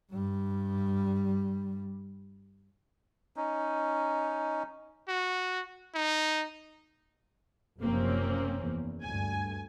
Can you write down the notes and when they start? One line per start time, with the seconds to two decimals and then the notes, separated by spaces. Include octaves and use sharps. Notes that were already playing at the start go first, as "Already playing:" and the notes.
0.12 G2 G3
3.36 C#4 D#4
5.08 F#4
5.95 D#4
7.81 F#1 C3 F3 A#3 C4 C#4
8.58 E2
9.03 D2 G2 G#5